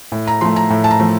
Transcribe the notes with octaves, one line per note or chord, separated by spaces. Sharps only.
A2
A#5
F3 A3 C6
A#5
A2
A5
A#5
F3 A3